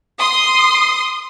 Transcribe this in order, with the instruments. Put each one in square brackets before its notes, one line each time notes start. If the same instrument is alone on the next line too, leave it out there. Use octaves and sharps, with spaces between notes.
[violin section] C6 D#6